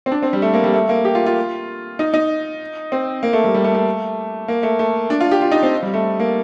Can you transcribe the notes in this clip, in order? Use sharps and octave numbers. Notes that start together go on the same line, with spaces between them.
C4
D4
C4
G3
A3
A#3
G3
A3
A#3
G4
F4
F4
D#4
D#4
C4
A#3
A3
G3
G3
A3
A3
A#3
A3
A3
D4
F4
G4
F4
D#4
C4
G3
A3
A#3